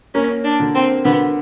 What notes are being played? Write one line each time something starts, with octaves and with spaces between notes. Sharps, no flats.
A#3 C#4
D4
D3
C4
D3 B3